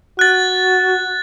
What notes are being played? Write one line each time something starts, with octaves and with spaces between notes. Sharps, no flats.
F#4 F#6 A6